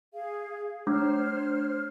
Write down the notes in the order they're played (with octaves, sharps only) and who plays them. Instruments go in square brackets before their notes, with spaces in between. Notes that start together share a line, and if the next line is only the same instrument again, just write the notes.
[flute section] G#4 F5
[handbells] A3 D4 [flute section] C5 C#5 F6